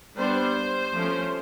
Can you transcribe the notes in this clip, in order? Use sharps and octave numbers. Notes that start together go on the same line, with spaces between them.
G3 B3 D4 C5
F3 A3 C#4